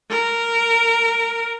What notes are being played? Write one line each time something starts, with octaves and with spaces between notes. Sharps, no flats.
A#4